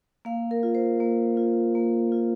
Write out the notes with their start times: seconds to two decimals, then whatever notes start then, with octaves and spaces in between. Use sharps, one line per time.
0.25 A#3 F5
0.51 A#4
0.63 F4
0.75 C5
1.00 A#3
1.37 F4
1.75 A#3
2.12 F4